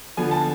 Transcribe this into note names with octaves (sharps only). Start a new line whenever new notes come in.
D3 F3 B3 G#5
A5